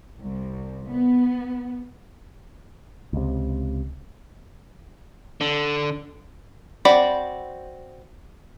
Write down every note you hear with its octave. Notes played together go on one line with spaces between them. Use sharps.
C2
B3
C#2 C3
D3
C4 F#4 D5 B5